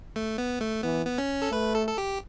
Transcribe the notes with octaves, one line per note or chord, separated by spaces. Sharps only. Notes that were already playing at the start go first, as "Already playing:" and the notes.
A3
B3
A3
E3 B3
B3
C#4
A4
A3 B4
A4
A4
G4